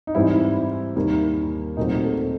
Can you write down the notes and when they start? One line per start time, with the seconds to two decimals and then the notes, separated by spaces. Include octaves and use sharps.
0.07 D#4
0.14 G#2 E3 G3 C4 E4
0.96 D#2 D#3 G3 A#3
1.77 A#2 F#3 A3 C4 D#4
2.04 A4